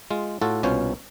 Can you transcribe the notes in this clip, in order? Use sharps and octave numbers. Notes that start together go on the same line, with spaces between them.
G#3 F4
A2 F4 F#4 A4
C2 B2 C#4 F4 C5 C#5